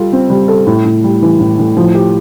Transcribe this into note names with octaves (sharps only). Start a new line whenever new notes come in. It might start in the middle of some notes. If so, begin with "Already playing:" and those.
Already playing: G3 F4 A4
C4
G3
A4
A2
A2
G3
E3
A2
A2
F3
G4